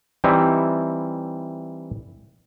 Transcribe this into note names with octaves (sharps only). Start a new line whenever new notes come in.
E3 G3 C4 D#4 E4